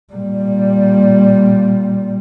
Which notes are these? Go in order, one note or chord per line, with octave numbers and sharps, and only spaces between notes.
A#2 G3